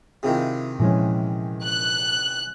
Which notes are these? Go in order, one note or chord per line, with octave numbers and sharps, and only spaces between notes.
C3 D#3 E4 F4 G#4
A#2 E3 F3 G#3 C#4
F#6